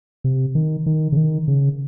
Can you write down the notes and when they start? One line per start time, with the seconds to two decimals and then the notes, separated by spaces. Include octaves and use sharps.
0.24 C3
0.55 D#3
0.86 D#3
1.12 C#3
1.17 D#3
1.48 C#3